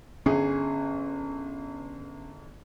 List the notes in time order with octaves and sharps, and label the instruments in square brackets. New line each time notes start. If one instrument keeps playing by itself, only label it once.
[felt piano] G1 G#4 [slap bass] C#4